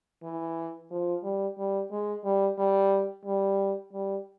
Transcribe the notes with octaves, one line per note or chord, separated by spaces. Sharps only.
E3
F3
G3
G3
G#3
G3
G3
G3
G3